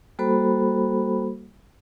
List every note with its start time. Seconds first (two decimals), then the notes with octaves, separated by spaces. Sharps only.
0.19 G3 A#3 F#4 A4 C5 B5